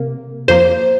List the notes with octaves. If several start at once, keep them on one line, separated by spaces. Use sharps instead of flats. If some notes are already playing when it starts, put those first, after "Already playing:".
Already playing: C3 A#3
F2 F3 A#3 C5